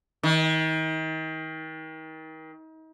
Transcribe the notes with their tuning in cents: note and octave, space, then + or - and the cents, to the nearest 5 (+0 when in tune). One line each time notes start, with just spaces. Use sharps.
D#3 +35